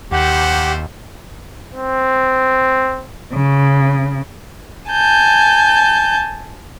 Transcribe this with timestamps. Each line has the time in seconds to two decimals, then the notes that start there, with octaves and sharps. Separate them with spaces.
0.12 D#2 A3 A#3 G4 C5 F#5
1.74 C4
3.33 C#3
4.91 G#5 A5 G6